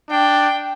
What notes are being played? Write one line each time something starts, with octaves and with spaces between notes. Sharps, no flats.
D4 G5